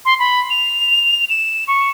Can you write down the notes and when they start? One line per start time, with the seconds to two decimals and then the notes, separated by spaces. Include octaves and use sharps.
0.05 C6
0.19 B5
0.50 F7
1.30 E7
1.68 C#6